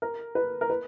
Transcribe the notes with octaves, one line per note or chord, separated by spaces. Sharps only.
A#4
B4
A#4
B4